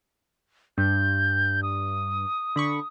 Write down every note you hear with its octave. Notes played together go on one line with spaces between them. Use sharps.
G2 G6
D#6
D3 B5 C#6